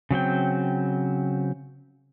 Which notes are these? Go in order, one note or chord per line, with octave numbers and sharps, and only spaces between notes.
C#3 F#3 C4 G5